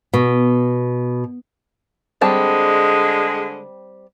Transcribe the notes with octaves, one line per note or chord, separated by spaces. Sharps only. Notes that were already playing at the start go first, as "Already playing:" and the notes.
B2
D3 G3 G#3 C4 A5